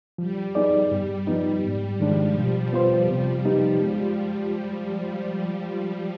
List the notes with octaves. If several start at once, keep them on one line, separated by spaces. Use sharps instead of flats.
F3 G3
B3 D#4 G#4 D5
G2
F3 B3 D#4
G#2 G3
D#3 F3 G#3 D4
B2
B3 F4 C5
C3
G3 B3 D#4 G4
G#3